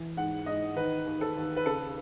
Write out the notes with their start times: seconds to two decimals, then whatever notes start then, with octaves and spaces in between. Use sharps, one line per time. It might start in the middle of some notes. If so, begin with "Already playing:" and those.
Already playing: E3
0.17 G#2 F#5
0.46 G#2 D#5
0.76 D#3 B4
1.06 D#2
1.21 A4
1.36 D#2
1.56 B4
1.66 C#3 A4